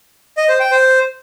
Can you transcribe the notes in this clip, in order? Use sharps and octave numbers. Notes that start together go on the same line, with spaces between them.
D#5
C5
G5
C5